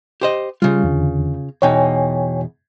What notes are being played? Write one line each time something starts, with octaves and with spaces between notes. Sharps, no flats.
G4 C5 D#5
C#3 G3 F4
E2 D3
E2 B2 D#4 C#5 G5 G#5